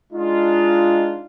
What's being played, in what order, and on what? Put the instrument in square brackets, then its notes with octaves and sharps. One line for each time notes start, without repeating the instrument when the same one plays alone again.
[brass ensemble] G#3 D4 D#4 F4